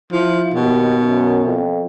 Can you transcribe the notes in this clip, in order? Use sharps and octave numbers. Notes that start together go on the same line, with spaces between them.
F3 E4
D#2 B2
F#2
F2